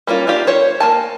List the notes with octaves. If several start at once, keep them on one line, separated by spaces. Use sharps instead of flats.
G3 A#3 C#4 F4
A#3 D4 F4 G4
C5 C#5
A#3 G#5 A5